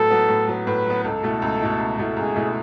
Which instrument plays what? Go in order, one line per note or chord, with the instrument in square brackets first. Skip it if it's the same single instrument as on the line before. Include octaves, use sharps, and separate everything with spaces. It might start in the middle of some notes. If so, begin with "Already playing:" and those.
Already playing: [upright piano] A2 F#3 B3 [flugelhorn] A4
[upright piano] F#3 B3
A2
F#3 B3
[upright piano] A2 [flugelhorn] B4
[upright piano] F#3 B3
[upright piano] C#2 [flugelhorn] A4
[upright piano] B2 A3 E4
C#2
B2 A3 E4
C#2
B2 A3 E4
[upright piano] C#2 [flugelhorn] G#4
[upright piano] B2 A3 E4